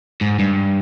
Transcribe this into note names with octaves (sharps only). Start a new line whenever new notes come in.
G#2
G2